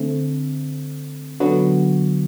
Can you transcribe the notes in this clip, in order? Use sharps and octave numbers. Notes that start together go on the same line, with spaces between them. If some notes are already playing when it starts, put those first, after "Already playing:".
Already playing: D3 A3 C4
D3 F#3 B3 F#4